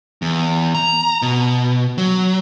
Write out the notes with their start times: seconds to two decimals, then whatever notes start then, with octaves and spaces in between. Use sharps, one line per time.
0.22 E2
0.75 A#5
1.22 B2
1.98 F#3